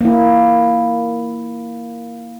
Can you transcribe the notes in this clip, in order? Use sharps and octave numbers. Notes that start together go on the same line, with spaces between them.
A#3 E4